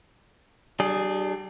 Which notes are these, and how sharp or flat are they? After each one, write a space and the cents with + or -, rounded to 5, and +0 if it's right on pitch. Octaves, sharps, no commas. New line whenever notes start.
G3 -35 D4 +25 G#4 +0